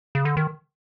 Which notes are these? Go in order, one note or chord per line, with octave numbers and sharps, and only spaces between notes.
C#3
D3
D#3